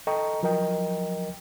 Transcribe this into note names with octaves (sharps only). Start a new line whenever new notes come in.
A4 D#5 G5 A#5 C#6
F3 F#3 A#4 D#5 G5